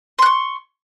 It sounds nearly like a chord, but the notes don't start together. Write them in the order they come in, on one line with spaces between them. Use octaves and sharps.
C6 F#6 C#6